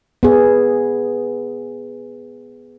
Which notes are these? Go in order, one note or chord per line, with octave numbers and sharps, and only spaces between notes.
B3 G#4